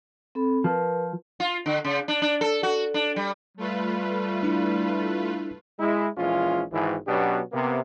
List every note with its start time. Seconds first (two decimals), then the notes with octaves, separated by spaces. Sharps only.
0.35 C4 A4 B5
0.64 F3 A#4 B4
1.40 F4
1.66 D3
1.85 C#3
2.08 D4
2.22 D4
2.41 A4
2.63 F#4
2.94 D4
3.16 G3
3.58 G3 A3 F4 B4
4.43 D4 E4
5.79 G#3 E4
6.17 A#1 E3 G#3 C#4 F4
6.72 G#1 E3
7.07 B2 F#3 B3 C#4 D4 G4
7.52 C3 A#3 B3